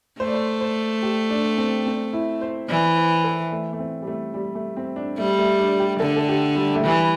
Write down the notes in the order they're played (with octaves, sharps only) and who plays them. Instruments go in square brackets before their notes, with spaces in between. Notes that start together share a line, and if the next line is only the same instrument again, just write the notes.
[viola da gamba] A3 [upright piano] C5
[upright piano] D5
C5
C5
G4
D4
C4
C4
E4
C5
[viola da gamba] E3 [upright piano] D5
[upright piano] C5
A4
A3
A3
C4
G3
A3
G3
A3
C4
D4
[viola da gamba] G3 [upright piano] A3
[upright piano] A3
D4
G4
[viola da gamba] D3 [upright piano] A4
[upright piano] A4
G4
G3
A3
[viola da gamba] E3 [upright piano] G3